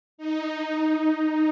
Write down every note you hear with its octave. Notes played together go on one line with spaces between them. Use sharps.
D#4